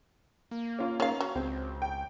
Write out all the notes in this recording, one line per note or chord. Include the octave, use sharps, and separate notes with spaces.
A#3
C#4 F4
D#3 C#4 F5
F#3
C#2 C4
G5